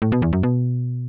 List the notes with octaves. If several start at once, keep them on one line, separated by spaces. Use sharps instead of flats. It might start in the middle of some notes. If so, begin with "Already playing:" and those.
A2
B2
E2
F#2
B2